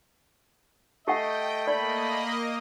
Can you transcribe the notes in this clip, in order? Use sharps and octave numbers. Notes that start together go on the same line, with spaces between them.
A3 G4 D#5 F#5 G5
A#3 D5 D#5 B5